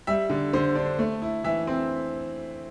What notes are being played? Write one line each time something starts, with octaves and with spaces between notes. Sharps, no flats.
G3 E5
D3
D3 C5
D4
A3
E4
E3 E5
C4